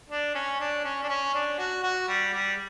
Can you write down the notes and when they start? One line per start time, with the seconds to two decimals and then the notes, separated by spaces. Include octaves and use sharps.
0.10 D4
0.35 C#4
0.60 D4
0.84 C#4
1.03 D4
1.09 C#4
1.34 D4
1.58 F#4
1.83 F#4
2.08 G3
2.34 G3